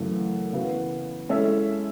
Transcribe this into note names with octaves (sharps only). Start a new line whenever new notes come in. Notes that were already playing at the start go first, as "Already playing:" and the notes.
Already playing: F#2 C#3 E3 A3
C#3 E3 B3 F#4
G#3 C#4 E4 A4 E5